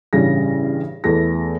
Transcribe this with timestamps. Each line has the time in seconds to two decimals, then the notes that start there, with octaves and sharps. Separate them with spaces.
0.13 A1 G2 C#3 G3 G#4 A#6
1.04 E2 A3 G#4 A4 B4 A#6